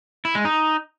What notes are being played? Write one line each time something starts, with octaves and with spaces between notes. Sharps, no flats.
E4
G#3
D#4